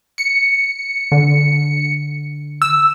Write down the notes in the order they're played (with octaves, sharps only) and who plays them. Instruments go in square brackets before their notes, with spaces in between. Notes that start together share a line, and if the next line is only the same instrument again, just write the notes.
[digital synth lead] C#7
[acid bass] D3
[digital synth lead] E6